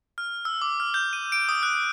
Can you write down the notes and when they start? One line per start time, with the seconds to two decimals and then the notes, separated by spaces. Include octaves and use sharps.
0.18 F6
0.45 E6
0.62 D6
0.80 F6
0.94 G6
1.13 D#7
1.32 D7
1.49 D#6
1.63 F#6